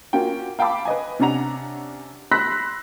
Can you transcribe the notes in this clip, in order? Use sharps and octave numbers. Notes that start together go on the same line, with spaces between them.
A#3 C#4 F4 F#4 G5
F5 G5 A5 B5 D6
B4 D#5 G#5
C3 C#4 D4 F#5 A#5 F7
B5 C6 E6 F#6 A#6 B6